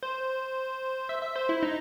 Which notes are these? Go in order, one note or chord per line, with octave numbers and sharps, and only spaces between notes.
C5
E5
E5
C5
E4
D#4